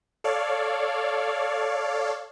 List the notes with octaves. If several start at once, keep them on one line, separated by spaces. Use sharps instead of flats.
A4 C#5 D5 F5